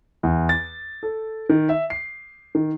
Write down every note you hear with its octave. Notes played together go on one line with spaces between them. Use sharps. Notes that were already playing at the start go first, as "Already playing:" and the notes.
E2
A6
A4
D#3
E5
C7
D#3